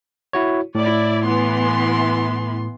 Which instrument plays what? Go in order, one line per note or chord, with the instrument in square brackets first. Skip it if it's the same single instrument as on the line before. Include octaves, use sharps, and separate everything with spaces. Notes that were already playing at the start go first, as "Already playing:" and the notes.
[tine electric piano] E4 F#4 C#5
[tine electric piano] A2 [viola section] E4 D5
[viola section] E3 B3 C6